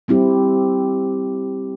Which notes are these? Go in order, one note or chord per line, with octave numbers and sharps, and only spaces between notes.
G3 C4 E4 G4